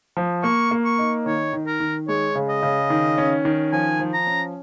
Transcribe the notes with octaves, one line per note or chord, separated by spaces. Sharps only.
F3
A#3 C#6
A#3
C#6
D#4
D#3 C#5
D#3
A#4
D#3
G#3 C#5
C#3
D#5
C#3
D#3
C#4
D#3
F3 G#5
F3
A#5
C#4